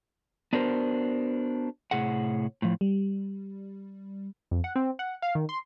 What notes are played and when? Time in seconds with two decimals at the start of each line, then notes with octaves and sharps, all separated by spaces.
0.53 B3 D4 F#4 A#4 C5
1.91 A2 C3 G#4 F#5
2.62 A2 F3
2.81 G3
4.51 F2
4.64 F#5
4.76 C4
4.99 F#5
5.22 F5
5.35 D#3
5.49 C6